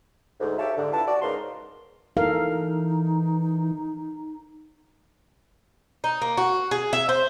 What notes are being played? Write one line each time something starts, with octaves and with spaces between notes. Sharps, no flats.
D2 G#2
G4 A4 C#5 E5 F5 A5
G#2 D3
E4 F4 G4 B4 A5
F#4 D5
G#2 C#3 A#4 B4 F5 C6
E3 D#4 A4 A#4 F5
D#4
A#3
F#4
G#4
E5
C5